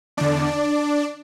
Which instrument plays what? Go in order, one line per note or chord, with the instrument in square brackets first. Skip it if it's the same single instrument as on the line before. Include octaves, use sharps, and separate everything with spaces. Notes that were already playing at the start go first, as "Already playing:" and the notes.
[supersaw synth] E2 D3 D4 D5